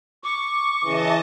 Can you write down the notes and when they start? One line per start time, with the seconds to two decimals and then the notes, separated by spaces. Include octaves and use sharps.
0.24 C#6 D6
0.84 C#3 E3 D#5 A5